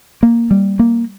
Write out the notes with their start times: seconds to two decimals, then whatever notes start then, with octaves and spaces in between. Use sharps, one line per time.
0.23 A#3
0.51 G3
0.79 A#3